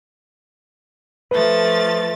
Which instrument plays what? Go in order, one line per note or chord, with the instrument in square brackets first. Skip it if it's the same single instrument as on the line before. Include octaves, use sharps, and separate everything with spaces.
[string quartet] F3 A3 A6 [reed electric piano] B4